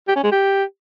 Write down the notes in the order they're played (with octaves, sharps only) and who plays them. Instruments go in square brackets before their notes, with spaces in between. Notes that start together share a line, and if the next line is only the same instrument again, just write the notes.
[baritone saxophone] G4
C#4
G#3
G4